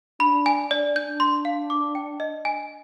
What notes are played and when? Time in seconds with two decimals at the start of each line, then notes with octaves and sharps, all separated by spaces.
0.20 D4 B5
0.46 G#5
0.71 D5
0.95 D4 G6
1.20 C6
1.45 F5
1.70 D6
1.95 G5
2.20 D#5
2.45 G#5